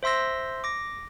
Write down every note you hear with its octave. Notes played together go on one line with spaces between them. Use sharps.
C5 E5 C6 E6 A#6
D6 A#6